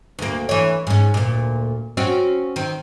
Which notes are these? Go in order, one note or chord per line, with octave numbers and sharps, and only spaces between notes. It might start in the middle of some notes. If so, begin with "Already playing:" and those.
D2 A#3
E3 C#5
G#2 C#4
D2 A#2
C4 C#4 F#4
D#3 C4